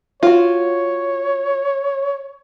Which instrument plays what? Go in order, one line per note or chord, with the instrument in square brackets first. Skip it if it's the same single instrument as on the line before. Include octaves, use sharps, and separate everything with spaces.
[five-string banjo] F4 F#4 [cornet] C#5